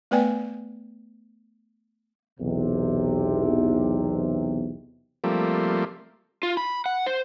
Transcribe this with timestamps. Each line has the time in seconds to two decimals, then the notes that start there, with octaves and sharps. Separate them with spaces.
0.11 A3 B3 B4 D5 G5 G#5
2.40 B1 E2 C3
5.24 F3 G3 A3 A#3 C4
6.43 F4
6.57 B5
6.86 F#5
7.06 C5